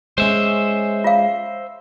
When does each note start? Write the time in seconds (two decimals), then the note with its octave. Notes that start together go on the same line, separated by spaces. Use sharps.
0.18 G#3 C#4 C5 E5
1.04 F4 F5